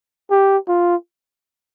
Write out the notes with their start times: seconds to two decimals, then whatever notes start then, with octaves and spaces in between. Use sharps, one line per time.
0.30 G4
0.68 F4